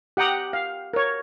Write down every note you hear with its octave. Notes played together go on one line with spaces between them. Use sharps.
G4 F#5 G5 A#5 D#6
F5
A#4 C#5